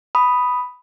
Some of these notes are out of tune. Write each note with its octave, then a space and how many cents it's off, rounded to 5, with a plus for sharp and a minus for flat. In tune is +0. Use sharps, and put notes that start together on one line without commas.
B5 +0 D#6 +0